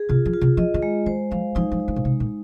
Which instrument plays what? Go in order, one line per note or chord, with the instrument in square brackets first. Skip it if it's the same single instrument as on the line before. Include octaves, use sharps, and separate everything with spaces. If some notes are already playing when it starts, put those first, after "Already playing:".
Already playing: [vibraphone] G#4
[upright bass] C3 [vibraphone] F4
[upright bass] F3
[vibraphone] F4
[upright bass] C3
[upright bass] F3 [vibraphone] D#5
[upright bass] D#3
[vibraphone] G#3
[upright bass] D#3 [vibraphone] C5
[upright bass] F3 [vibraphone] F5
[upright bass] F3 [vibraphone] D#4
[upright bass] F3
[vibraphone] D#4
[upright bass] D#3
A#2
[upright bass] C3 [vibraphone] G#3
[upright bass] A#2